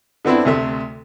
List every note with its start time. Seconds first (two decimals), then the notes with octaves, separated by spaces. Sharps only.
0.25 D3 B3 C4 D4 E4
0.45 D2 C3 A3